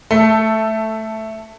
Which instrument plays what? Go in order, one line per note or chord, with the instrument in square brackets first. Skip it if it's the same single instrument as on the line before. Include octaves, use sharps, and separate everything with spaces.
[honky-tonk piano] A3 A4